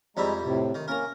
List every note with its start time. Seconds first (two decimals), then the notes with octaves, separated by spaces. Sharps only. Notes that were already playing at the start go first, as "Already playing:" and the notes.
0.17 F2 G3 G#3 E4 A#5
0.44 A2 C3
0.75 D#3
0.88 A#3 C#4 A#4 A#5